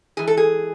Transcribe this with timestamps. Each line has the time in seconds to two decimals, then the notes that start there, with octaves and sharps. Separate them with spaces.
0.17 G#2 E3 G#4
0.27 A4
0.37 G#4